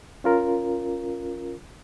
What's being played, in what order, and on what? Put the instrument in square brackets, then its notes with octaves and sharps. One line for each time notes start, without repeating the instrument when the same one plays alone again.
[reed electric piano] C#4 F4 A#4